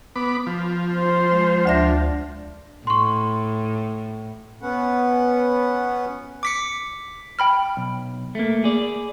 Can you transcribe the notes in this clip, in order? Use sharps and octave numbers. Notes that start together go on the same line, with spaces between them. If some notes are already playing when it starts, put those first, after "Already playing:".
B3 B5 D6
F3
C5
G#3
D2 D4 E5 A#6
A2 C6 C#6
B3 C#4 B4 F#5
D6 B6 C#7
G5 B5 F6
B1
A3 A#3
G#4 D5